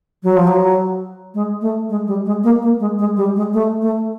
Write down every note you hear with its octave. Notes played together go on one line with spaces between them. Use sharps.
F#3
F3
F#3
G#3
A3
G#3
G3
G#3
A#3
A#3
G#3
G#3
G3
G#3
A3
A3